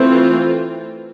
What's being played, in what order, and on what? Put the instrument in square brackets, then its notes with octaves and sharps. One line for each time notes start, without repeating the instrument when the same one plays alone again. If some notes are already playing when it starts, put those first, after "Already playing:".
Already playing: [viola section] E3 A3 C4 F4